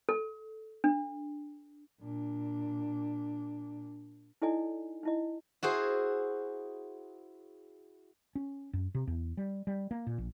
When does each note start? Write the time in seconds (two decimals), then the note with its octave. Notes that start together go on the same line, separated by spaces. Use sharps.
0.09 A4
0.84 D4
2.01 A#2 D4
4.42 D#4 E4 A4 D5 D#5 G#5
5.03 D#4 E4 D#5
5.63 E4 F#4 G#4 C5
8.35 C#4
8.73 F#2
8.95 C3
9.07 E2
9.37 G3
9.67 G3
9.91 A#3
10.07 A#2
10.18 A#1